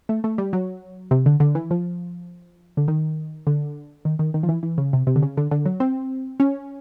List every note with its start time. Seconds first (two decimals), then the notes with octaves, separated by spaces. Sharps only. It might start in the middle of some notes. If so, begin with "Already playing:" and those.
0.09 A3
0.24 A3
0.38 G3
0.53 F#3
1.11 C3
1.26 D3
1.40 D3
1.55 E3
1.71 F3
2.77 D3
2.88 D#3
3.47 D3
4.05 D#3
4.19 D#3
4.34 D#3
4.43 F3
4.49 E3
4.63 E3
4.78 C#3
4.93 C3
5.07 C3
5.16 D3
5.22 C#3
5.37 D3
5.51 D3
5.66 F#3
5.80 C4
6.40 C#4